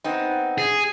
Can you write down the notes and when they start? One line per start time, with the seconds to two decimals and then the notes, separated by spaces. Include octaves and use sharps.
0.04 B3 C4 D#4
0.58 G#4